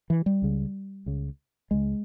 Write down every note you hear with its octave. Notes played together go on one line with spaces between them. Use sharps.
E3
G3
C#2 C#3
C#2 C#3
C#2 C#3 G#3